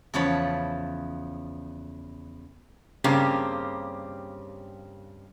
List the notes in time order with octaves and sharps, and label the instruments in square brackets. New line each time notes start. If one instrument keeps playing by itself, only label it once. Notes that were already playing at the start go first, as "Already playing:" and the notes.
[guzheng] E2 C#3 F3 C#5 A5 B5
[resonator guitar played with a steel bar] G2 C#3 A#3 C4 G4